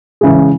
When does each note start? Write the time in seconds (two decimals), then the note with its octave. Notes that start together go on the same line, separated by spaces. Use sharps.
0.21 C#3 E3 G#3